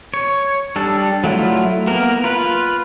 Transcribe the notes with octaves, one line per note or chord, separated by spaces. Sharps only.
C#5
G3 D4 A4
F#3 A3 E4 F4
A#3 B3 A#4
F4 B4